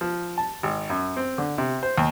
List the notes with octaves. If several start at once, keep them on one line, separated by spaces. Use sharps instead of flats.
F3
A5
G#1
F#2
C4
D3
C3
C5
D#2